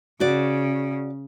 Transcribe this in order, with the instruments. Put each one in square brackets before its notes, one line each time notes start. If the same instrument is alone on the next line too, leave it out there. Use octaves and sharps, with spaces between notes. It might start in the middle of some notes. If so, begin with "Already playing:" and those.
[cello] C#3 [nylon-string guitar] F#4 D5